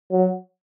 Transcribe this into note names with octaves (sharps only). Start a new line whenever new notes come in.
F#3